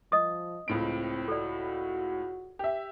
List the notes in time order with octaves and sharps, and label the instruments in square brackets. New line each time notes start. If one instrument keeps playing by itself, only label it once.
[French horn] F3 [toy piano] D#5 D#6
[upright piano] C#2 A2 D7 [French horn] C4
[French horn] F#4 [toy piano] A4 D5
[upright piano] G4 E5